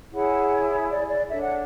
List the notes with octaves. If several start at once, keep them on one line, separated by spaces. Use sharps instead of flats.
E4 G#4 C#5 F#5
E5
D5
D5
D4 A4 C#5 E5
F#5